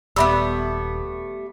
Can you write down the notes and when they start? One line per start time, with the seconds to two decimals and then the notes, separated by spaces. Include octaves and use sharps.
0.16 D#1 G3 A3 B3 E5 B5 E6